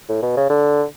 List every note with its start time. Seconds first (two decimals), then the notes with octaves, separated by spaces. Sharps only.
0.09 A2
0.22 B2
0.37 C#3
0.50 D3